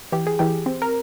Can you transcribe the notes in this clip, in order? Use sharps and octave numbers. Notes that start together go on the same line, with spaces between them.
E3 G4
G#4
E3 G4
C4
A#4